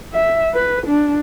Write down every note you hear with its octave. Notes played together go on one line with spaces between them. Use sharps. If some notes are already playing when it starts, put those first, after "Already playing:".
E5
B4
D4